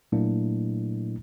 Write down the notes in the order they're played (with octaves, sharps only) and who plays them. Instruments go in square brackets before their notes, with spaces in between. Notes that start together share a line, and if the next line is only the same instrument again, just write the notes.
[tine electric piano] A#2 F#3 A3 A#3 D4 E4